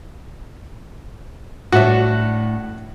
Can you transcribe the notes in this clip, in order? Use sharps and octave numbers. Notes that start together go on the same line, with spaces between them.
A2 D4 F#4 C#5 E5